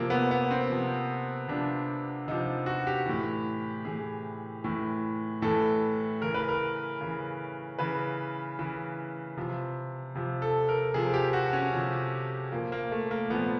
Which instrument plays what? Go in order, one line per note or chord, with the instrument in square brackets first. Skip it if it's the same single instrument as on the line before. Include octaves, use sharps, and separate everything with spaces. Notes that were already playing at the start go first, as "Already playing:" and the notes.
Already playing: [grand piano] C3 F3 A#3
B3
B3
C4
C3 F3
C3 F3 D4
C3 F3 D#4
F#4
G4
A2 E3
A2 E3 G#4
A2 E3
A2 E3 A4
C#3 E3 A#4
B4
A#4
C#3 E3
C#3 E3 B4
C#3 E3
C3 F3
C3 F3
A4
A#4
C3 F3 G#4
G4
F#4
C#4
C3 F3
A#2 F3 A#3
A#3
A3
A#3
A#2 F3 B3